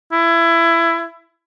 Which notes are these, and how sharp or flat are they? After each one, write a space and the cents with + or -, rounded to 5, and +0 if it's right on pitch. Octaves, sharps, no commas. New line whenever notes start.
E4 +20